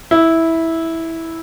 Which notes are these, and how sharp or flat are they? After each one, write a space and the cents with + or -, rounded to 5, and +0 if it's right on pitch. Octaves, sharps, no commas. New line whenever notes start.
E4 -10